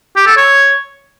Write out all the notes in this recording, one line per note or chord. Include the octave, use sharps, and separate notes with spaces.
G4
A4
C#5